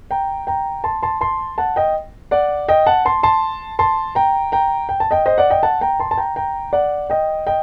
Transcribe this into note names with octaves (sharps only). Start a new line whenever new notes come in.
G5 A#5
G5 A#5
A5 C6
A5 C6
A5 C6
F#5 A5
D#5 G5
D5 F#5
D#5 G5
F#5 A5
A5 C6
A5 C6
A5 C6
G5 A#5
G5 A#5
G5
A5
D#5 G5
C5 D#5
D5 F#5
D#5 G5
F#5 A5
G5 A#5
A5 C6
A5
G5 A#5
G5 A#5
D5 F#5
D#5 G5
D#5 G5